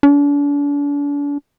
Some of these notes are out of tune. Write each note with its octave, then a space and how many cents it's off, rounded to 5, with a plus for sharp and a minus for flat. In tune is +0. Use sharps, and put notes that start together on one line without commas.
D4 -40